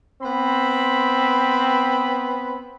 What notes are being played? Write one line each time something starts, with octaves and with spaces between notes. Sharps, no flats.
B3 C4 B5